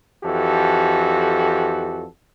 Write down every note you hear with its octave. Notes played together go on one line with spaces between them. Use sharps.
F2 E3 F#4 G4 A4